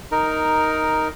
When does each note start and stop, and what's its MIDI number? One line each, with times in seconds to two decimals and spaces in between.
0.12 1.08 63
0.12 1.08 70